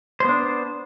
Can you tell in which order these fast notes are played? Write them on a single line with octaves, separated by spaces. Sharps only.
C5 B3 D4